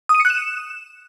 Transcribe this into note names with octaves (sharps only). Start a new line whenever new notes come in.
D#6
D#7
C#7
F#6
E7